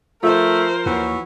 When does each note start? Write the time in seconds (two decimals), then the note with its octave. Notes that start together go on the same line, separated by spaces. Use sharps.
0.23 F3 A3 A#4 C5 E5
0.86 D#2 E3 F#4 C#5